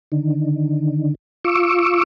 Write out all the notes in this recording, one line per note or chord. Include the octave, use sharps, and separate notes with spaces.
D3 D#3
F4 C#6 D6 E6